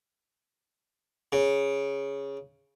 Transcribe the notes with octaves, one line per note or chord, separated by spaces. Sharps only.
C#3